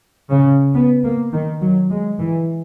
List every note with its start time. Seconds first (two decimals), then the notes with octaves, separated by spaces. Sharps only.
0.31 C#3
0.74 B3
1.04 A#3
1.32 D#3
1.61 F#3
1.91 G#3
2.20 E3